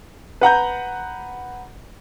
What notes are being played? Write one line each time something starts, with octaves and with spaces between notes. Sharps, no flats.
B4 F#5 A#5 G6